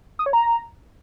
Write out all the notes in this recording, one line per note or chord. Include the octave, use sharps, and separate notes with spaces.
D#6
C#5
A#5